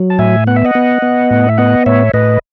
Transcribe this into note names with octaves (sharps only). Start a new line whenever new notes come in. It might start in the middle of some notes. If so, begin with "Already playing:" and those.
Already playing: F#3
A5
A2 E5 G#5
B3 F#5
E5
D#5 F#5
B3
B3
A2
E5
B3 D#5 F#5
A2 C#5 E5
A2 B4 D#5